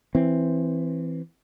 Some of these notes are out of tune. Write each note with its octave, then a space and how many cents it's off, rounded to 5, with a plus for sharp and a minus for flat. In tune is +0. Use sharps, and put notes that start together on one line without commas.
E3 +0 C4 +0